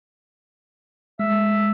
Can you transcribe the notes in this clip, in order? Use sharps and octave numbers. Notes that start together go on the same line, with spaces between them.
G#3 E5